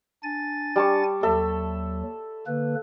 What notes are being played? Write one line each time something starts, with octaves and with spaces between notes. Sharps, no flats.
D4 G#5 A6
G3 A5 C#6
D#2 F#3 A4 E5
D3 A#3 B4